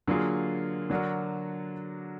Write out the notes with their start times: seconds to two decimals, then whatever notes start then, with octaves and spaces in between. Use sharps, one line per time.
0.07 D3 F#3 A#3 F4 G#4
0.90 D3 F#3 D4 F#4 A#4